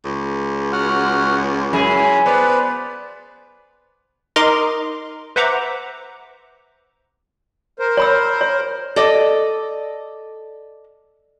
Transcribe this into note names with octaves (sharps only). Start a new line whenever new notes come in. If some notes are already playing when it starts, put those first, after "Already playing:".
C#2
F#4 F#5 F6
F#2 E4 G#4
B3 B4 C5 D5
D#4 A#4 D#5 A#5 C6 D6
B4 C5 E5 F#5 A#5 D6
A#4 C5
C#5 B5 E6
C#5
A4 D5 D#5